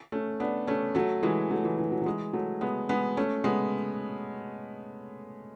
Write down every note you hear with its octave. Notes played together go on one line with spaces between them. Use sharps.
A3 C#4
B3 D4
A3 C#4
F#3 A3
E3 G#3
F#3 A3
E3 G#3
E3
F#3
F#3
E3 G#3
F#3 A3
G#3 B3
G#3 B3
A3 C#4
G#3 B3